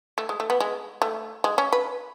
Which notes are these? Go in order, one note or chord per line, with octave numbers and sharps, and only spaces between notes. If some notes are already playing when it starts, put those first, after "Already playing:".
A3
G#3
A3
B3
G#3
A3
G#3
C#4
B4